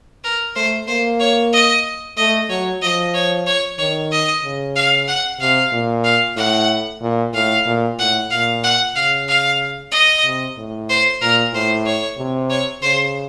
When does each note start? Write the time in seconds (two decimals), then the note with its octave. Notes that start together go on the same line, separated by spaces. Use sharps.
0.24 A#4
0.56 A3 C5
0.87 A#3 C5
1.20 C#5
1.53 D#5
2.17 A3 D#5
2.50 F#3 C#5
2.82 F3 D#5
3.14 C#5
3.47 C#5
3.78 D#3 C#5
4.11 D#5
4.44 C#3
4.76 F5
5.08 F#5
5.39 C3 F5
5.72 A#2
6.04 F5
6.37 A2 F#5
7.02 A#2
7.34 A2 F5
7.66 A#2
7.99 A2 F#5
8.31 A#2 F5
8.64 F#5
8.95 C#3 F5
9.28 F5
9.92 D#5
10.24 C3
10.57 A2
10.89 C5
11.21 A#2 A#4
11.53 A2 C5
11.86 C#5
12.18 C3
12.50 C#5
12.82 C#3 C5